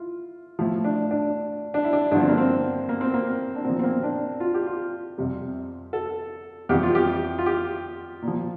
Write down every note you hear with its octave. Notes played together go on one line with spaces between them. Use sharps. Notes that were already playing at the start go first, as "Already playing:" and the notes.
Already playing: E4 F4
A2 F3 E4
D4
D4
D4
E4
D4
G2 D3 F3 D4
C4
A#3
C4
A#3
C4
A#3
D4
A#2 F3 C4
C4
A#3
D4
F4
G4
F4
F2 C3 G3
A4
F2 E3 G3 G4
F4
G4
F4
G4
A#2
F3